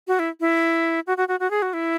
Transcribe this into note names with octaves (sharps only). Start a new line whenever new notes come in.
F#4
E4
E4
F#4
F#4
F#4
F#4
G#4
F#4
E4